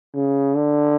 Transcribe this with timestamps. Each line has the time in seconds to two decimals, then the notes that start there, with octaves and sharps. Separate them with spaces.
0.15 C#3
0.56 D3